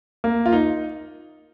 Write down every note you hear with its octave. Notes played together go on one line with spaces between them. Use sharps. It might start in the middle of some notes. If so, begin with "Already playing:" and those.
A#3
F4
D#4